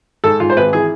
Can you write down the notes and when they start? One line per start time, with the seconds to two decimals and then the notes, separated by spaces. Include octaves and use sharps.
0.24 G#2 A4
0.40 G#2 F4
0.50 C5
0.57 G#1 B4
0.73 E3 G#4